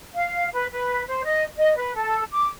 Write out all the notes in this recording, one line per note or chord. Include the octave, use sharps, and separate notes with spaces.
F5
B4
B4
C5
D#5
D#5
B4
A4
D6